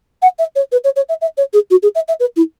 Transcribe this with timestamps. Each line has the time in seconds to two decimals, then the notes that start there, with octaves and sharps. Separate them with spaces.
0.22 F#5
0.38 E5
0.55 C#5
0.72 B4
0.84 C#5
0.96 C#5
1.09 E5
1.21 E5
1.37 C#5
1.53 G#4
1.70 F#4
1.82 G#4
1.95 E5
2.08 E5
2.20 B4
2.36 E4